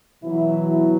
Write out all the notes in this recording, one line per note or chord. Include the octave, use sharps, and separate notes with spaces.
B2 E3 F#3 E4